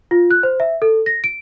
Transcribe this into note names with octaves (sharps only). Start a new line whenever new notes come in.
F4
F#6
C5
E5
A4
A#6
D7